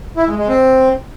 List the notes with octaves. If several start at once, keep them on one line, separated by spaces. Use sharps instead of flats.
E4
G#3
G#3
C4